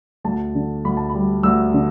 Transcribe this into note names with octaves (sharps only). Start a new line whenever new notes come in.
D2 A5
D3
D2 B5
A5
G3 B5
D2 E6
D3